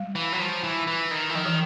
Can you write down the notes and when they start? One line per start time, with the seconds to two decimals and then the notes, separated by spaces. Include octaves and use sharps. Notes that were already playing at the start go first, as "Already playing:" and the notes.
Already playing: G3
0.15 E3
0.32 F#3
0.40 F3
0.63 E3
0.87 E3
1.11 D#3
1.30 E3
1.35 D#3 F3
1.46 E3